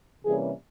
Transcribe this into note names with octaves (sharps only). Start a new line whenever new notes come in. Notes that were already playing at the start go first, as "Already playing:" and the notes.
C3 E3 G3 A#3 C#4 G#4